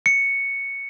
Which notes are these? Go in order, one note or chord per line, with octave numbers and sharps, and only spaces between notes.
C#7